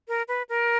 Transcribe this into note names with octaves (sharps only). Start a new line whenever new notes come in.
A#4
B4
A#4